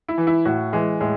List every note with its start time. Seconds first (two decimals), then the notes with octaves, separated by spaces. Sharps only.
0.08 E4
0.18 E3
0.27 E4
0.45 A2 F#4
0.73 E3 G#3
1.00 A2 G#3